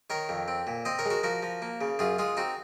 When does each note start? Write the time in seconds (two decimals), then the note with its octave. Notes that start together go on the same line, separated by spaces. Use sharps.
0.10 D#3 A#4 C#5
0.29 F2
0.48 C4
0.67 A#2
0.85 C4 C5 D#5
0.99 A#4 C#5
1.05 G#3
1.10 F#4 A#4
1.23 F3 F#4 A#4
1.43 F3
1.62 A#3
1.81 C#3
1.99 F#2 F4 G#4
2.19 G#3 F4 G#4
2.37 C4 D#4 F#4